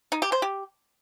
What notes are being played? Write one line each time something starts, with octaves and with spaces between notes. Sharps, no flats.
D#4
G4
C5
G4